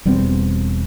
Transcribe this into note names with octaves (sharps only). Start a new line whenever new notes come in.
E1 G3 B3 C4